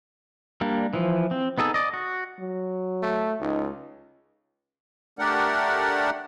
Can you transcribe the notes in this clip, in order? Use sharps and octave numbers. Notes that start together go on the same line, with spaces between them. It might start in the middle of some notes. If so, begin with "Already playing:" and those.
G3 A#3 D4
E3 F3
C4
B3 D#4 G#4 A4
D5 D#5
F#4
F#3
A3
C#2 D#4
A3 D4 G4 A#4 D5 F#5